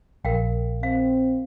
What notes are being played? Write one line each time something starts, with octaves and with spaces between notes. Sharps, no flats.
A#1 A#4 F5 G5
C4 F5